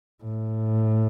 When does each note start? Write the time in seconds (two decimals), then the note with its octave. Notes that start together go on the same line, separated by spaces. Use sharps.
0.24 A2